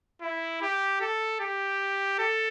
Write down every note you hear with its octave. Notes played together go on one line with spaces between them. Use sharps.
E4
G4
A4
G4
A4